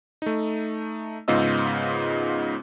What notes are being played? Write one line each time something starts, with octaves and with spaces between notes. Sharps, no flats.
A3 D#4
G#2 C#3 B3 F4 D#5 E6